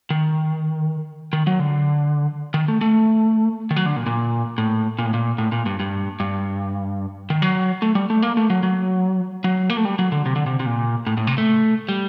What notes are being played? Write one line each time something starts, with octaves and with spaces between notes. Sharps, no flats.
D#3
D#3
F#3
D3
D#3
A3
A3
D#3
F#3
D3
A#2
A#2
A2
A#2
A2
A#2
A2
A#2
G2
G2
G2
D#3
F#3
A3
G3
A3
A#3
A3
F#3
F#3
F#3
A#3
A3
G3
F#3
D3
C3
D3
C3
C3
A#2
A2
A2
C3
A3
G3